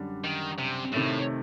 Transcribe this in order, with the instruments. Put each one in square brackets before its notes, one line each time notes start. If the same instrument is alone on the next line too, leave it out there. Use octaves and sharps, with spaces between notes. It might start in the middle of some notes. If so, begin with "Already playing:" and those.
Already playing: [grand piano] F#2 D3 G3 D4
[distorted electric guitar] D#3
C3
[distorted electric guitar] A2 [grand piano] C3 D#3 A3